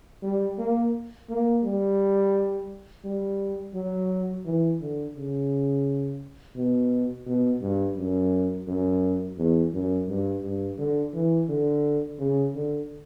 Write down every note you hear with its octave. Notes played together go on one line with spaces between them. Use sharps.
G3
A#3
A#3
G3
G3
F#3
E3
D3
C#3
B2
B2
G2
F#2
F#2
E2
F#2
G2
G2
D3
E3
D3
C#3
D3